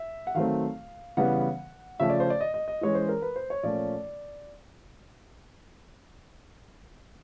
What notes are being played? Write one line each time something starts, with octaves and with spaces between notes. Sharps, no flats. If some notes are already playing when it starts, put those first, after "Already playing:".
Already playing: E5
F#5
D#3 F#3 A3 C4 F5
C#3 E3 G3 B3 F#5
C#3 F3 A3 C#4 E5
D5
C5
D5
D#5
D#5
D#5
E3 G#3 C#4 C#5
C5
A#4
B4
C5
C#5
A#2 F3 A3 C#4 D5